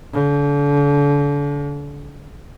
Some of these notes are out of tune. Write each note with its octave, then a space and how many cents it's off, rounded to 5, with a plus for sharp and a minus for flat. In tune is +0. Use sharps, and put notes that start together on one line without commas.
D3 -35